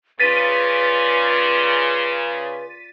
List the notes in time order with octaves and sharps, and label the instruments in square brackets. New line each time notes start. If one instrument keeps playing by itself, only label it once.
[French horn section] C#3 [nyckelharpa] F4 D5 [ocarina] B4 [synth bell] A6 B6 D#7